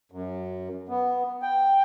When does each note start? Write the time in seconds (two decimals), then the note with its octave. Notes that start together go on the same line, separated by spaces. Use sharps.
0.11 F#2
0.89 B3
1.42 G5